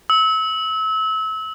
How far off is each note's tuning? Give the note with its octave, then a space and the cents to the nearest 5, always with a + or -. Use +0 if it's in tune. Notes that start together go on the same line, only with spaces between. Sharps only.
E6 -30